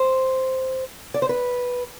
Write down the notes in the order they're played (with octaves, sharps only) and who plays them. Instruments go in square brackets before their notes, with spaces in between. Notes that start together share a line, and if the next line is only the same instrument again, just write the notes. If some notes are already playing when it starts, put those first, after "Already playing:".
Already playing: [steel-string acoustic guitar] C5
D5
C5
B4